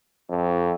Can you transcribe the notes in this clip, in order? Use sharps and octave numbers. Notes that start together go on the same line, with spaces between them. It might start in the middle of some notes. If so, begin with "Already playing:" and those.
F2